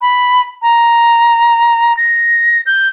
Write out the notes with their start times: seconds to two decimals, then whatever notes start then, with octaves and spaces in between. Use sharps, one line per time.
0.01 B5
0.62 A#5
1.97 A#6
2.66 G6